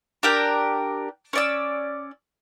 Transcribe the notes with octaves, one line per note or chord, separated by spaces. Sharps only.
D4 G4 A#4 G5
C#4 D5 E6